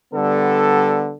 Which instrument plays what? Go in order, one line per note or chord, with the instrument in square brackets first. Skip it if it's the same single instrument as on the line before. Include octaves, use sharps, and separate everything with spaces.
[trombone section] D3 G3 B3 A4